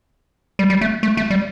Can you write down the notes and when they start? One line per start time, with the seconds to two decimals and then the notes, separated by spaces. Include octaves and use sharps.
0.59 G3
0.70 G3
0.81 A3
1.03 A3
1.17 A3
1.30 G3